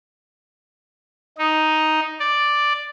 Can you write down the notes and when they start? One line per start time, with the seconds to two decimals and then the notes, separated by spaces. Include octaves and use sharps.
1.38 D#4
2.20 D5